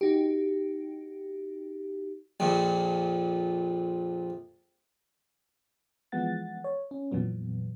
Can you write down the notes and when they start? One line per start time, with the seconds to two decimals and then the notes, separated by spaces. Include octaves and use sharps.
0.01 D#4 F#4 G4
2.40 A#1 F2 A#2
6.12 E3 F3 G#3 B3 F#5 A6
6.64 C#5
6.91 C#4
7.12 F2 A#2 E3 F#3 B3